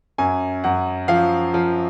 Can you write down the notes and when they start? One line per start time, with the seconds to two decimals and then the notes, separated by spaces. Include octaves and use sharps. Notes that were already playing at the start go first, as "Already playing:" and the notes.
0.18 F#2 G#5
0.64 F#2 F#5
1.08 F3 F5
1.54 F3